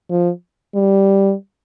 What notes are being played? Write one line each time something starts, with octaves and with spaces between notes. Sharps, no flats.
F3
G3